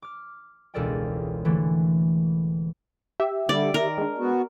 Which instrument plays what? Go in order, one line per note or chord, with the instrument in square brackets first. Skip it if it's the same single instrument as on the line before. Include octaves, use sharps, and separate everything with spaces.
[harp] D6 F6
E1 C#2 A4 A#4 D5 G5
D3 E3 A3
[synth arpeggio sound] G4 E5
[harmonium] D3 G3 [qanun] D5
[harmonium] D#3 [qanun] A#4
[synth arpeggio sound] G#3 D4
[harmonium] B3 F#4